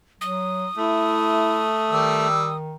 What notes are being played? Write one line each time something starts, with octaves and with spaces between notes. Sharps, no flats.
F#3 D#6
A3 E4
D#3 G3 E6